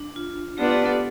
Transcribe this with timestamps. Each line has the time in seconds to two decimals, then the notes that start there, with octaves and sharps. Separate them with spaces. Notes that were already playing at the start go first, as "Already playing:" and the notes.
Already playing: D4
0.16 F4
0.58 B3 D4 F4 G4 B4 D5
0.71 G4
0.86 A4